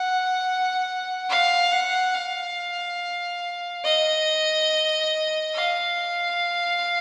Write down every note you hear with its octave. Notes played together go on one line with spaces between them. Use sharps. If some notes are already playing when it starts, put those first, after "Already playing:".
Already playing: F#5
F5
F#5
F5
D#5
F5